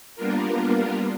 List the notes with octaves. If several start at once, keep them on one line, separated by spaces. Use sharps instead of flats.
G3 A#3 B3 D4 F4 A#4